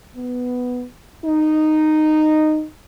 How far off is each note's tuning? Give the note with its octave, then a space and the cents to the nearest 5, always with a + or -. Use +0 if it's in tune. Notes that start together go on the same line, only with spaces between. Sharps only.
B3 +5
D#4 -10